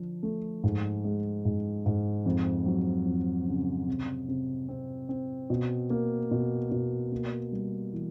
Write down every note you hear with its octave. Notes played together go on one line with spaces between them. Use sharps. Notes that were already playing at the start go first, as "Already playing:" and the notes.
Already playing: D3 F3 D4
A3
G#2
G#3
G#2
G#2
F2
F#3
F2
C#3
C3
C3
C4
C4
B2
A#3
B2
B2
A#3
G3
E3